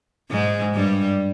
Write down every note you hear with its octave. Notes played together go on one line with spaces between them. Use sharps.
G#2 G#3
G2 G3